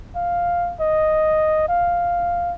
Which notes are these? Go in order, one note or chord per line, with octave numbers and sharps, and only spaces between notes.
F5
D#5
F5